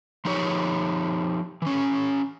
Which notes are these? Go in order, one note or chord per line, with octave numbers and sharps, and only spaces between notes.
F3 D#4 G4 C#5
E3 C#4